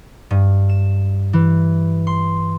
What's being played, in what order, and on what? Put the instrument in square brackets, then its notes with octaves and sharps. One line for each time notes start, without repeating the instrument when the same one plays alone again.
[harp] G2
E7
E3
C6